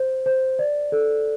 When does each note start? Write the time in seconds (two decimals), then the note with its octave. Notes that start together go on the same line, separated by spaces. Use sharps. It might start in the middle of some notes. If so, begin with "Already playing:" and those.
Already playing: C5
0.26 C5
0.59 D5
0.92 A4